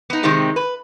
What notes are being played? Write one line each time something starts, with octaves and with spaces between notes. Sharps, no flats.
B3 D#4
C3 D#3 G#3 C4 D#4 G4
B4